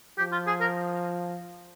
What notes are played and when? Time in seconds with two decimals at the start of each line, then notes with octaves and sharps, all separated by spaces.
0.18 F3 G4
0.32 F4
0.47 G#4
0.61 A#4